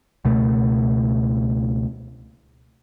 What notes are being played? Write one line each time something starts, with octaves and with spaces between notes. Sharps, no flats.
C#2 B2 A3